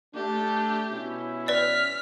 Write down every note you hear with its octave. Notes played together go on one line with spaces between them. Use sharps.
A3 D4 G4
B2 C#4 E4
B4 D5 F6 B6